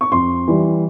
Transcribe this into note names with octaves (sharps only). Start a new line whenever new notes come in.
C#6
F2 C6
E3 G3